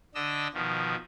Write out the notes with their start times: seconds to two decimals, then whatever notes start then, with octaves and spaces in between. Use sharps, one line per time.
0.15 D3 D4 D#5 E6
0.54 B2 D#3 F3